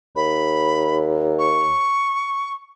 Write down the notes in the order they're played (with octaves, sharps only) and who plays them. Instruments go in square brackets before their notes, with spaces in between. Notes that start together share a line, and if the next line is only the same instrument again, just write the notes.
[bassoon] D#2 [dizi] B5
[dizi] C#6